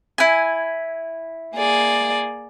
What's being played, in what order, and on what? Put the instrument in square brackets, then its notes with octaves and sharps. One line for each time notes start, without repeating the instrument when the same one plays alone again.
[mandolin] E4 G#5
[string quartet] A#3 G#4 D5